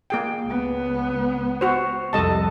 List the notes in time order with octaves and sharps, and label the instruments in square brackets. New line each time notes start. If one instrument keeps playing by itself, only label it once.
[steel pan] A#3 G#4 G5
[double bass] C#2 B3
[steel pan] F#4 C5
[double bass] C2 F2 [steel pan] A4 D#5 A5